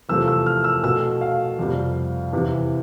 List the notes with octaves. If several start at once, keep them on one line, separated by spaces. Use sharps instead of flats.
E2 C3 F3 A3 E6
E6
F6
E6
B2 A3 E6
F5
F2 C3 G3
E2 C3 E3